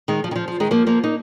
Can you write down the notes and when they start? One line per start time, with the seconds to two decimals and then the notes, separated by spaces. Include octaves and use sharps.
0.08 D#3 G#3
0.24 F3
0.31 D#3
0.36 F3
0.48 F3
0.60 D#3 G#3
0.71 F3 A#3
0.87 F3 A#3
1.04 A#3 D#4